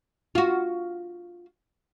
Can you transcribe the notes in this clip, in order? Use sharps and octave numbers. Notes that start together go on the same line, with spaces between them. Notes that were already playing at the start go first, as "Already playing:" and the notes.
F4 F#4